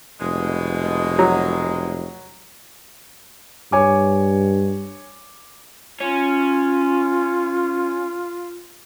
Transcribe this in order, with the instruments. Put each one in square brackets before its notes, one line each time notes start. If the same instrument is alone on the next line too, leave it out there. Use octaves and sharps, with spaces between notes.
[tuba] F1 [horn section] B2 G#3
[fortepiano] F#3
[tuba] G2 [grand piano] C#5 G#5 D6
[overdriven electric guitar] C#4 [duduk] F4